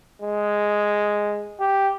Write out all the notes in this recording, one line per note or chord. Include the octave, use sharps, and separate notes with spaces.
G#3
G4